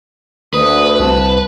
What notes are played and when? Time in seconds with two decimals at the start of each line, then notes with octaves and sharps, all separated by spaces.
0.54 D2 B4 D#6
1.00 C2 A5